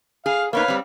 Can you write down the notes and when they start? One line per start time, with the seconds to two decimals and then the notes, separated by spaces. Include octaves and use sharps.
0.26 G#4 F5
0.53 A#3 B3 D#4 B4 C#5 F5
0.68 G3 C4